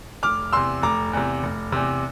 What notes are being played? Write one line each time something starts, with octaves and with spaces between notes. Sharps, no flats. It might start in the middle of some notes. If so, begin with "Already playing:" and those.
F1 D6 F6
E2 C3 C6 E6
F1 A#5 D6
E2 C3
F1
E2 C3